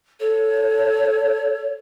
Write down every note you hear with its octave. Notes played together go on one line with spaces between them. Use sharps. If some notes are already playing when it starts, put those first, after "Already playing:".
A4 C#5